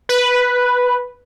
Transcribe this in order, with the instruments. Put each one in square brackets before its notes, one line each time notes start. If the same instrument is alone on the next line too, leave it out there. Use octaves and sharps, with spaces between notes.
[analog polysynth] B4